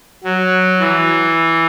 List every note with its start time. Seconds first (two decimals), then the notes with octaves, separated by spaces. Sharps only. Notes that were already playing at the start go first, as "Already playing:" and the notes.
0.24 F#3
0.79 E3